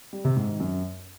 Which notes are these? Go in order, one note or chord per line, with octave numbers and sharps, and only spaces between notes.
G3
C3
G#2
D#3
F#2